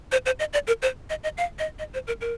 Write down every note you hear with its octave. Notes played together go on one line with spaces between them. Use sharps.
C5
C5
D#5
D5
A#4
C5
D#5
D#5
F5
D#5
D#5
C5
A#4
A#4